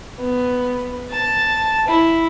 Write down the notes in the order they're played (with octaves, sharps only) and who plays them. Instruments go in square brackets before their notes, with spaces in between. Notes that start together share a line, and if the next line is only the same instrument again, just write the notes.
[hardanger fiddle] B3
A5
E4